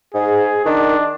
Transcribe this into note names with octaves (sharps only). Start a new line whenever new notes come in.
G#2 G#4
D#3 D4